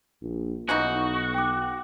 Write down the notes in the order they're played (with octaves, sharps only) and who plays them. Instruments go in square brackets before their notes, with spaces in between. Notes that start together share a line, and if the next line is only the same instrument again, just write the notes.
[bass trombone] A#1
[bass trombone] B1 [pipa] C#3 E3 D#4 [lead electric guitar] F#4
[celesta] G5 D6